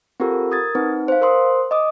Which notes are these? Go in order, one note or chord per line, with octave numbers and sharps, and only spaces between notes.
C4 F4 G4 A4 A#4
A#4 D#6 G#6 A6
C4 D#4 B4
C5 F5
A#4 C5 C6 D#6
D#5 D6 D#6